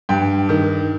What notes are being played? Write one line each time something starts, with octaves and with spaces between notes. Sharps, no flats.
G2 G5
D#3